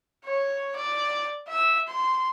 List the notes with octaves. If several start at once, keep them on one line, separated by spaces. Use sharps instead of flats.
C#5
D5
E5 E6
C6